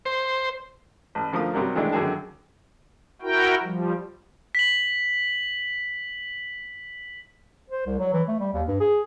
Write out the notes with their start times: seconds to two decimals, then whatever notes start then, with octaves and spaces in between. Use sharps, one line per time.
0.05 C5
1.15 A1
1.33 D3 F3 A3 A#4 D#6
1.53 C3 F#3 G3 A#4
1.75 D#3 E3 G#3 A3 D4 E4
1.92 F#2 D3 D#3 F#3 G#4 A5
3.22 E4 F#4 A#4 G5
3.63 F3 G3
4.55 B6 F#7
7.70 C5
7.86 C2
7.98 F#3
8.13 E3
8.28 A3
8.39 G3
8.53 D#2
8.68 G2
8.80 G#4